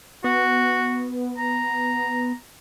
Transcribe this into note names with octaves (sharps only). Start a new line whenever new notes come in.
B3 F#4
A#5